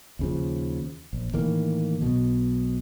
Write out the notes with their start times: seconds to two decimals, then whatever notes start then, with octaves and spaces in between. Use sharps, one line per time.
0.19 D#2 C#3 F3
1.13 A#1
1.33 A2 D#3 E3 A#3
2.01 B1 B2